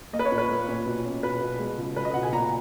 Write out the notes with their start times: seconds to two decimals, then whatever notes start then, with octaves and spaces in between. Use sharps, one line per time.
0.13 A#3 D#5
0.19 B4
0.25 C#5
0.32 A#2
0.38 B4
0.49 A#3
0.68 A#2
0.86 B2
1.05 C#4
1.23 B2 B4
1.41 B2
1.59 G#3
1.78 C#2
1.96 C#2 B4
2.05 D#5
2.14 B2 F#5
2.23 G#5
2.32 A#2 A#5